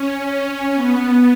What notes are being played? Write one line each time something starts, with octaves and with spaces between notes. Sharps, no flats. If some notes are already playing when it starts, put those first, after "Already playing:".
Already playing: C#4
C#4
B3